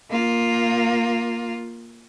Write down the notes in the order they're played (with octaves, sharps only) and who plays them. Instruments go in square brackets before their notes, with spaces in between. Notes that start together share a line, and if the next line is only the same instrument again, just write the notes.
[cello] A#3 F4